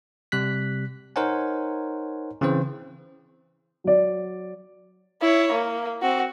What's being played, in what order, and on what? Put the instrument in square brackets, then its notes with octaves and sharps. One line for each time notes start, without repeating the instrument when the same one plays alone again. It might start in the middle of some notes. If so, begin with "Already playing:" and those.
[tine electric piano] C3 G3 F#6 B6
D#4 A#4 C5 C#5 F#5 G#5
C#3 E3 C4 C5
[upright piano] F#3 D5
[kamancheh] E4 C#5
A#3
C4 F#4